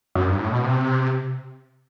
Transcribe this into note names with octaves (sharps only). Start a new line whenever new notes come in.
F#2
G2
A2
B2
C3